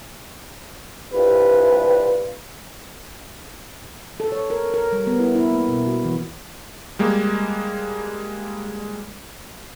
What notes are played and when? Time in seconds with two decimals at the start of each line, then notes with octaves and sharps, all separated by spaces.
1.14 C2 G2 F4 B4
4.20 A4
4.32 C#5
4.50 A#4
4.74 A#4
4.92 G3
5.07 B3
5.19 E4
5.35 E4
5.53 A#3
5.68 B2
5.87 F#4
6.04 E3
6.99 G3 G#3 A#3